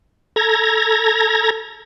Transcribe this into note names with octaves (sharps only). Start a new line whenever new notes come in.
A4 A#5 G#6 A#6